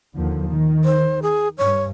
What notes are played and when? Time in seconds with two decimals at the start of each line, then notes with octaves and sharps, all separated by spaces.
0.15 D#2 D3 F3
0.48 D#3
0.85 C5
1.22 G#4
1.58 G2 C#5